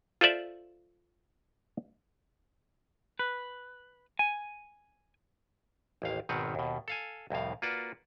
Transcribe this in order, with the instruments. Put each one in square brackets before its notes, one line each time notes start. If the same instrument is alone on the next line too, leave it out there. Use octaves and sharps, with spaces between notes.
[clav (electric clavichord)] F4 A4 C5 D5 E5
[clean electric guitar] B4
G#5
[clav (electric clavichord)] A1 D#2 F5
G#1 B2 D#3 C4 B4 C#5
D#2 B2
A4 F5 G#5
C2 F2 A2 F5
A#3 F4 F#4 B4 D5